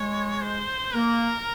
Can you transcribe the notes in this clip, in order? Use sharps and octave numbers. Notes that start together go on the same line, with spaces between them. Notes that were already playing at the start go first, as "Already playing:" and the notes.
Already playing: G#3 C#5
C5
A#3 A#4